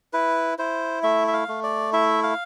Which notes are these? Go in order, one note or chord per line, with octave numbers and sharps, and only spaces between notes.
E4 B4
E4 C5
A3 E5
E5
F5
A3
D5
E4 E5
F5